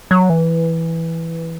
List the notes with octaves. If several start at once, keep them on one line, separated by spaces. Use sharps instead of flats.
F#3
E3